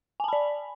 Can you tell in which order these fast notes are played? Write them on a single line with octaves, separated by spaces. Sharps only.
G#5 A5 B5 D5